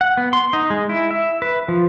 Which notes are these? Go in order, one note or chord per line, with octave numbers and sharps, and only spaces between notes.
F#5
B3
C6
D#4
G#3
E4
E5
B4
F3